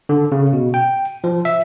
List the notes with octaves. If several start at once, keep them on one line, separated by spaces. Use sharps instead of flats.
D3
C#3
B2
G5
F3
E5